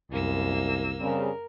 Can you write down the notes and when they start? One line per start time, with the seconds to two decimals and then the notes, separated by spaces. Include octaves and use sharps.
0.12 C2 F#2 A#3 E6
1.00 C#3 G3 C4 A#4